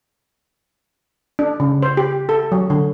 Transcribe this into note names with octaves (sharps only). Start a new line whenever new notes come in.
D4
C#3
C5
G4
A4
F#3
D3